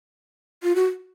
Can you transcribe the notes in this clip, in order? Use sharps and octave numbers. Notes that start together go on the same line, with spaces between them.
F4
F#4